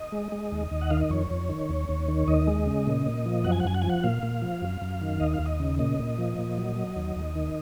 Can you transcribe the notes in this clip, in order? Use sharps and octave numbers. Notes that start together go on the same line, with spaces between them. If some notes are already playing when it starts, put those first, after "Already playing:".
Already playing: D#5
G#3
G#3
D#2
D#2
F#5
D#3 F5
D#5
F2 C#5
F2
D#3
D#2
D#2
D#3
D#2 D#5
G#3
C#3
A#2
A#2
F3
F#2 F#5
G#5
F#5
F#2 G#5
F#5
F3 G#5
F#5
A#2 F5
A#2
F3
F#2
F#2
D#3
D#2 D#5
F5
D#2
D#5
C#3
A#2 D#5
A#2
F3
A#2
F#3
F#3
D#2
D#2
D#3